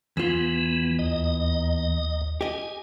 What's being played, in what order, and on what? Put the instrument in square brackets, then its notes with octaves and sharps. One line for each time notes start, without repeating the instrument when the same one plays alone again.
[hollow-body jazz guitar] E2 F4 [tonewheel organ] E3 B3
[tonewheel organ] D#2 D#5
[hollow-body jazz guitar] G4 D#5 [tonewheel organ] G#5